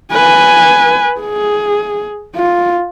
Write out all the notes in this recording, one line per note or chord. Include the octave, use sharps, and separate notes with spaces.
B4 G#5
G#4
F4